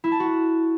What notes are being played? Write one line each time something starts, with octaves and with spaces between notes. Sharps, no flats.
E4
A5
F#4